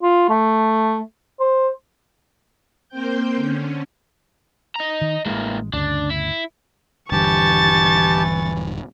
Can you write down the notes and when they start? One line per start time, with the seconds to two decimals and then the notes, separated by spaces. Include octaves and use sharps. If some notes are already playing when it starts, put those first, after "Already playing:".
0.03 F4
0.29 A3
1.40 C5
2.89 A#3 C4 C5 G5 G6
3.36 D3 C#4
4.76 D#5 A#5
5.01 D#3
5.26 A1 E3 G#3 A#3
5.73 G1 D2 C#3 D4
6.10 E4
7.12 D#1 G2 D3 E3 G4 A5 C#6 A6